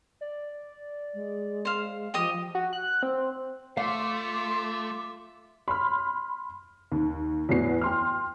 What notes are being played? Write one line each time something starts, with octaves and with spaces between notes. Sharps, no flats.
D5
G#3
C5 F5
F3 G4 D#5 D#6
F#4
F#6
C4
A3 F4 E5 F5 C6 D6
B5 C6 F6
D#2
E2 A2 B3 F#4 C7
G5 C6 F6